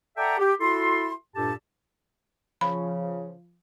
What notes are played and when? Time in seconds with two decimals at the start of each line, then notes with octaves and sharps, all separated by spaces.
0.17 A4 D5 E5 F#5 G5 A#5
0.38 G4
0.60 E4 F#4 A4 C6
1.35 G2 A#2 G4 A4 A5
2.61 C#3 F3 B5